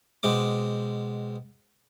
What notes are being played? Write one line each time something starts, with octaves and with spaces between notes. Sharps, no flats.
B2 G#3 C4 D6